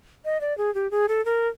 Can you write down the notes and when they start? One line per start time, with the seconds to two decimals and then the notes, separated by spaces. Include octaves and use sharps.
0.25 D#5
0.41 D5
0.58 G#4
0.75 G4
0.91 G#4
1.09 A4
1.25 A#4